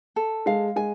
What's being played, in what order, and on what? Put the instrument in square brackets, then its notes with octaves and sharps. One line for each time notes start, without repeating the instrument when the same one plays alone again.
[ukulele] A4
[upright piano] G#3 [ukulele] F5
[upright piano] G#3 [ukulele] G#5